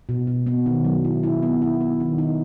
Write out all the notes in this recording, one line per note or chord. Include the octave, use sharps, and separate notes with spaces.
B2
B2
B3
D#3
F#3
E4
E4
B3
E4
B3
D#3
D#4